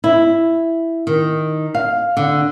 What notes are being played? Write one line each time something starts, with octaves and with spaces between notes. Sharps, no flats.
E4
D#3
F5
D3